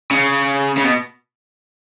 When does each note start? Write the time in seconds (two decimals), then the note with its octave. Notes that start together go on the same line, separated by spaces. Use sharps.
0.11 C#3
0.77 C#3
0.84 B2